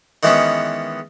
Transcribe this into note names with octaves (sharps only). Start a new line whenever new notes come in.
D#3 E3 G#3 B3 C#4